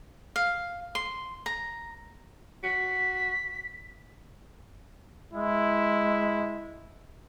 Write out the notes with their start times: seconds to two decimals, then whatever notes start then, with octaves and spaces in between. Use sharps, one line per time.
0.36 F5
0.95 C6
1.46 A#5
2.63 F#4 B6
5.33 G#3 E4